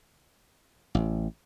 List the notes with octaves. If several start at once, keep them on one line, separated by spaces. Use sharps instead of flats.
A1